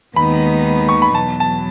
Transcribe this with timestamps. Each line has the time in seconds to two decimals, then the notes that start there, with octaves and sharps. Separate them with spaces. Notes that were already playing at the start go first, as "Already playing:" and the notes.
0.16 D#2 D#3 G#3 B3 D#4 B5
0.89 C#6
1.02 B5
1.14 E2 B2 F#3 A5
1.40 A5